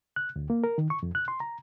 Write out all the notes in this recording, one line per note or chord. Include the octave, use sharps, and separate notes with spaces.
F#6
D2
A#3
A#4
D#3
C#6
F2
F#6
C6
A#5